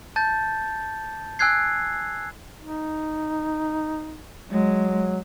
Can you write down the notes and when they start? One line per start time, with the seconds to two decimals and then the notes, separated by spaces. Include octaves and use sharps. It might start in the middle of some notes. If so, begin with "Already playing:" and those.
0.16 A5 G6 A6
1.39 G#5 E6 F#6 G#6 C7
2.60 D#4
4.50 F#3 G#3